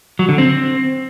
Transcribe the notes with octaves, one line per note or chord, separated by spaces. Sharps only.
F#3
D3
C4